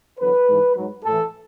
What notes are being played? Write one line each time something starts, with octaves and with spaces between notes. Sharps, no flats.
E2 D3 F#3 B4
G#2 E3
G#2 F#3
A2 E3 A4